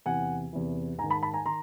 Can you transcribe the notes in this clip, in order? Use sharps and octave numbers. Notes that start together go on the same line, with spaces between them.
E2 C3 E3 F#5 G#5
E2 C3 E3
G#2 G#5 A#5
D#3
A5 B5
A5 B5
G#5 A#5
D#3 A#5 C6